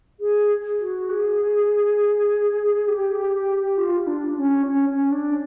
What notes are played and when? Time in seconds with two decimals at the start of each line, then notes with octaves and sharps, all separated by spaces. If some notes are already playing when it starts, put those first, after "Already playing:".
0.20 G#4
0.80 F#4
1.10 G#4
2.88 G4
3.77 F4
4.07 D4
4.37 C#4
4.67 C#4
4.89 C#4
5.12 D4